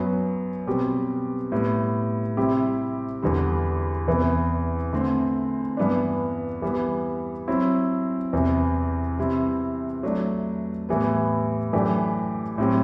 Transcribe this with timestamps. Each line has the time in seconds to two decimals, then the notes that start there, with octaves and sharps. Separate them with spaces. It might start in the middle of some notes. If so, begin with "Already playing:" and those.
Already playing: F#2 F#3 B3
0.67 B2 G3 C4 G4
1.52 A2 G3 B3
2.37 C3 G3 C4 E4 G4
3.22 E2 D3 G3
4.08 E2 C3 E3 B3
4.93 D3 A3 C4
5.77 G2 E3 B3 D4
6.62 E3 G3 B3
7.48 F#3 C4 E4
8.33 E2 C3 E3
9.19 C3 G3 C4 E4
10.03 F#3 A3 D4
10.89 A2 E3 G3 B3
11.73 F#2 E3 A3 D4 G4
12.58 A2 F#3 C4 G4